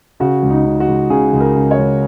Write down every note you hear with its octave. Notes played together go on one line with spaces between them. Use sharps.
C#3 F#4
C#2
D#4
C#3
F#4
C#2
C#3 G#4
C#2
A#4
C#3
C#5
C#2